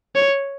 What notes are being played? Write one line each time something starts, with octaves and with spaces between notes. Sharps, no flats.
C#5